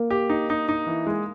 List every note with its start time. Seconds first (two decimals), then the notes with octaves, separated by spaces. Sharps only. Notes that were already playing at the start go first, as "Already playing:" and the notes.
Already playing: A#3
0.11 G4
0.29 D#4
0.50 D#4
0.69 D#4
0.87 E3
1.07 G#3